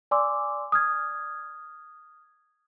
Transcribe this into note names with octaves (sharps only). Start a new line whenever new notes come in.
D5 G#5 C6 D6 E6
D#6 F6 G#6